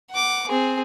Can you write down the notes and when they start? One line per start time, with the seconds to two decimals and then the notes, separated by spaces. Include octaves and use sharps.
0.11 F#5 D6
0.48 C4 G#4